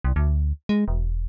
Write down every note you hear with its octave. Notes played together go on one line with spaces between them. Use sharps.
C2
D2
G#3
E1